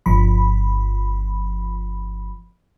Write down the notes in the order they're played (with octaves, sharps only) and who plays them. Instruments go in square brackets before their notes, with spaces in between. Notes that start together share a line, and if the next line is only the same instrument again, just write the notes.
[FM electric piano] G1 F3 B5